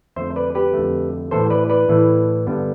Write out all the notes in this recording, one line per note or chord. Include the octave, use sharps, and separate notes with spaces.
F2 D3 A3 C5 E5
B4 D5
G4 B4
F2 D3 A3
A2 E3 A3 A4 C5
B4 D5
B4 D5
A2 E3 A3
G2 D3 G3 B3